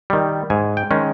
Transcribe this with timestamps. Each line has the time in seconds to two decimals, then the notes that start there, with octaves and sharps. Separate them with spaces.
0.10 D#3 G3
0.50 G#2 G#5
0.77 G5
0.91 D#3 G#3 C#4